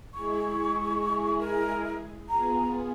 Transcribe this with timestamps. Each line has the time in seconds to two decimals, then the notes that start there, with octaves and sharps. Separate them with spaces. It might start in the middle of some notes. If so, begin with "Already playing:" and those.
0.14 G#3 E4 G#4 C#6
1.39 A#4
2.29 B3 F4 G#4 A#5